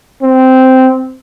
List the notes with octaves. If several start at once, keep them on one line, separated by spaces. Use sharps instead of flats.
C4